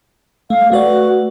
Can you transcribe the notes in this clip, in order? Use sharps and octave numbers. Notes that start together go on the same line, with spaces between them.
A3 F5
A3 F#4 B4 D5